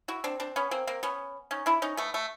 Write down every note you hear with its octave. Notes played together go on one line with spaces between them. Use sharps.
E4 F#4
C4 D4
C4 D4
B3 C#4
A#3 C4
A#3 C4
B3 C#4
C#4 D#4
D4 E4
C#4 D#4
A3 B3
A3